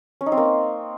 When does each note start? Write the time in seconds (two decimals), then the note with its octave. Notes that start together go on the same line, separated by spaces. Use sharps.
0.21 C#4
0.26 D#4
0.32 C4
0.37 A#3